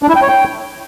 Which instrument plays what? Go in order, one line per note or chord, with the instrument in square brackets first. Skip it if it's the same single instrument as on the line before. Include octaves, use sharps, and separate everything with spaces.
[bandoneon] D4
E4
G5
C#5
G5